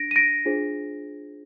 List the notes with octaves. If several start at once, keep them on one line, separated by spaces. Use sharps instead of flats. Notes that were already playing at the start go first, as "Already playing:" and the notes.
Already playing: D4 A#6 D7
D#7
A#6 D7
D4 F4 G#4 C5